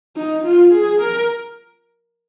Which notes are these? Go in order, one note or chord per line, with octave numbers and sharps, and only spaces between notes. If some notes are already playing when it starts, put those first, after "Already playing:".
D#4
F4
G#4
A#4